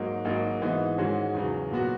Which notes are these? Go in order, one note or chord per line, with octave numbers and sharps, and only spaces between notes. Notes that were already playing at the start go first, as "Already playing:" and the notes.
Already playing: G#2 F#3 A#3 D#4
G#1 G#2 F#3 A#3 D#4
G#2 E3 B3 D#4
G#2 D#3 G#3 C#4 F#4
E2 C#3 F#3
A#2 F#3 B3 F#4